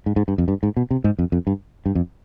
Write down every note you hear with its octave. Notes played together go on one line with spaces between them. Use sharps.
G#2
G#2
G2
F2
G2
G#2
B2
C3
G#2
F2
F2
G2
G2
F2